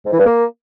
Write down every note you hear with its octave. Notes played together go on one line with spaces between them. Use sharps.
G#2
E3
G2
A#3